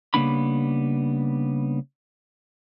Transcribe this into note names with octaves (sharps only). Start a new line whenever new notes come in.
C#3 G3 A#3 B3 D4 B5